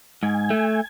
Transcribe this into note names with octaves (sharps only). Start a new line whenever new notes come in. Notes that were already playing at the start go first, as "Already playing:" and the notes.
G#2 G#5
A3